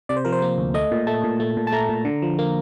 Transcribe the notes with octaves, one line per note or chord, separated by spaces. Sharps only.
C3 D5
C5
F3 A#4
C5
A#3
D2
A3 D#5
A#2
A3 A5
A#2
A3
A#2
A5
A3 A#5
A#2
D3
F3
A#3